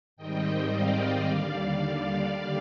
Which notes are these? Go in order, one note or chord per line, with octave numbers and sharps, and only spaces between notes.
G#2 D#3 G3 C4 D#5 G5
D5 F5
D#2 D3 G3 D5 F5